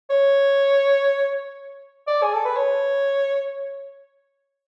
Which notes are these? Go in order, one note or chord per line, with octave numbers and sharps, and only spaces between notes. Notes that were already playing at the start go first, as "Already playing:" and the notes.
C#5
D5
G#4
A4
B4
C#5